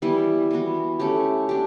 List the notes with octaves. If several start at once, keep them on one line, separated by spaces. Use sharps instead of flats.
E3 G3 B3 E4
E3 B3 F#4
A3 C#4 G4
D4 G4